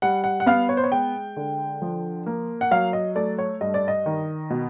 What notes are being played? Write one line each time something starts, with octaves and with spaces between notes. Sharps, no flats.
G3 F#5
F#5
F#5
B3 F5
C#5
C5
C#5
G#3 G5
D3
F3
A#3
F#5
F#3 F5
D#5
A3 D5
C#5
G2 D#5
D5
D#5
D#3
B2